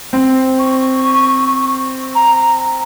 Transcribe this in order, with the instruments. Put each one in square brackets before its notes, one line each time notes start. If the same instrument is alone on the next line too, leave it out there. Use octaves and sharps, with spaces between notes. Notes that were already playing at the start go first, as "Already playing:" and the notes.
[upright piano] C4
[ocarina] C#6
A#5